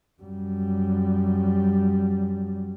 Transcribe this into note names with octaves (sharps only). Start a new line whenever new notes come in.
F#2 G3